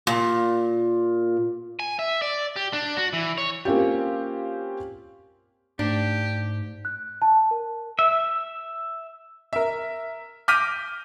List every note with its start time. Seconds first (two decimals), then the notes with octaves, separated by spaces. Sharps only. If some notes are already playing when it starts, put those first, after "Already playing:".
0.07 A#2
1.80 G#5
1.99 E5
2.22 D5
2.56 G4
2.73 D4
2.97 F#4
3.13 E3
3.38 C#5
3.65 A#3 C4 C#4 F4 G4
5.79 G#2 A3 D4 G4
6.85 F#6
7.22 A5
7.51 A#4
7.99 E5
9.53 A#4 E5
10.48 D6 F6 G6 A#6 B6 D#7